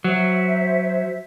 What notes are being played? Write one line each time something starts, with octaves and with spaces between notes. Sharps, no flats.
F#3 C5 E5